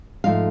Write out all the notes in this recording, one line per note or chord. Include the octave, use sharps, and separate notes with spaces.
G#2 F3 A3 F5